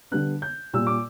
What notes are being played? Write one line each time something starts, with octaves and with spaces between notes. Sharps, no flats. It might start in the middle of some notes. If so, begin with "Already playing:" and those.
D3 G3 B3 D4 F#6
G6
A#2 G3 A#3 E6
D6